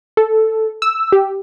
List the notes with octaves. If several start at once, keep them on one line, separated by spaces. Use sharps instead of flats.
A4
E6
G4